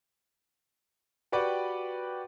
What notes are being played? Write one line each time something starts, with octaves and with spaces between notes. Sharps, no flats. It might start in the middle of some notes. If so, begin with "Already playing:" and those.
F#4 G4 B4 D5 F#5 G5